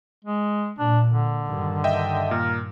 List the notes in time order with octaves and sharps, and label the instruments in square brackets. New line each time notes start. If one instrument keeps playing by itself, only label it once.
[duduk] G#3
[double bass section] A#2 [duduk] D4
[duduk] D3
[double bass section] G2 D#3
[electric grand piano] D#5 E5 G5
[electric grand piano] A#2 [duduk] A#4